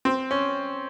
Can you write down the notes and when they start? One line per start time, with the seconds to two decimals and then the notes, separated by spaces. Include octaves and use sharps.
0.05 C4
0.31 C#4